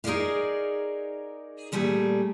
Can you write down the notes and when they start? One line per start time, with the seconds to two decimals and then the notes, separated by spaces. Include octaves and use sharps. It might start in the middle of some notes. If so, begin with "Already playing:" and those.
0.04 D#4 G#4 A#4 C#5 D5 F5
1.72 A#2 G3 A3 G#4